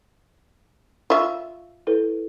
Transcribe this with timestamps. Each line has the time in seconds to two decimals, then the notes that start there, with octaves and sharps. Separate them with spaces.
1.10 F4 E5 C#6
1.87 E4 A4 B4